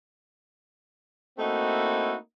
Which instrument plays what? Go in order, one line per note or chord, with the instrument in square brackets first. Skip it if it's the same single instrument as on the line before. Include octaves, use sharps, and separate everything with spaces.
[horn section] A3 A#3 C4 D#4 E4 F#4